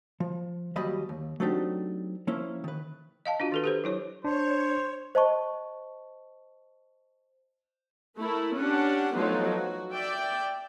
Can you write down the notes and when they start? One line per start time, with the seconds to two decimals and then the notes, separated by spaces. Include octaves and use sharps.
0.20 F3
0.76 D#2 F#3 G3 D#5 B5
1.09 D#2
1.40 F#3 A3 C4 D4 D#4 G4
2.27 F3 A#3 C#4 E4
2.64 D#3 B4
3.26 D#5 F5 A5
3.40 D4 F4 F#4
3.52 D#3 A4 B4
3.64 G4 A4 C5
3.84 F#3 E4 C#5
4.24 D4 C5 C#5
5.15 C5 D#5 A5 C#6
8.18 A3 E4 A#4
8.58 C#4 D4 G4 F#5
9.16 F3 F#3 A3 B3 D#4 F4
9.49 F#4
9.94 D5 E5 G5